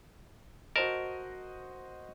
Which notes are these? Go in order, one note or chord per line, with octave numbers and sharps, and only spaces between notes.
F#4 A#4 C5 D#5 A5